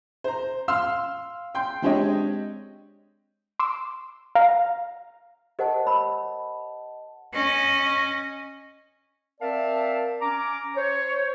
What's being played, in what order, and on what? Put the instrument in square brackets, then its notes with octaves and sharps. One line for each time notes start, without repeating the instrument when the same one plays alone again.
[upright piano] C5 A#5
F5 C6 E6 F6
G5 C6 G6
G#3 C4 D4 G4 C#5 D#5
[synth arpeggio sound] C6 D6 E6
F5 A#5
[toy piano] G4 A#4 C5 [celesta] D#5 F#5 A5
[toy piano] C#5 B5 E6
[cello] C#4 D#5
[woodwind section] C4 A#4 D5 E5 F5 A5
C#4 A#5 D6
C5 C#5